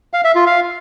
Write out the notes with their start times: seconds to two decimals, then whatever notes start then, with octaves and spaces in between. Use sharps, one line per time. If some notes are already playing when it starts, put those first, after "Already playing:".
0.14 F5
0.24 E5
0.35 F4
0.46 F5